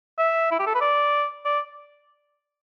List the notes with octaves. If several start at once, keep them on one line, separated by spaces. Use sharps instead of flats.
E5
E4
G4
A4
B4
D5
D5